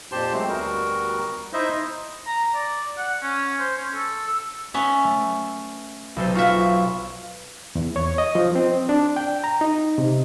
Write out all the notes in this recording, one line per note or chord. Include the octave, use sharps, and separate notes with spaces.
F2 A#2 G4 C5 A5 C6
F#3 G#3 A3 C4
D2 G3 B3 F#4 A#4
D#4 E4 C5 D#5 E5
A#5
D5
F#5
C#4
C5
C#4
A4
E6
B3 C#4 E5
A3
B1 A4 C5
F4 F#4 E5 F5
E2
C#5
D#5
F3
C4
D4
G5
A#5
D#4
C3